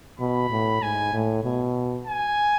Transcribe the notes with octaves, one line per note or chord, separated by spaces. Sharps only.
B2 B5
A2
G#2 G#5
A2
B2
G#5